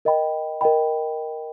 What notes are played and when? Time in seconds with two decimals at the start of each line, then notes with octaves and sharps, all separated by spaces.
0.05 A#4 D#5 G5 B5
0.61 A#4 D#5 G5 B5